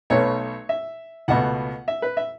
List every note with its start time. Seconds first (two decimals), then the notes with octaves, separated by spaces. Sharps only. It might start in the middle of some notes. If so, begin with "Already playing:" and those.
0.10 B1 B2 A3 C#5
0.69 E5
1.28 C#2 B2 A3 F#5
1.88 E5
2.02 B4
2.17 E5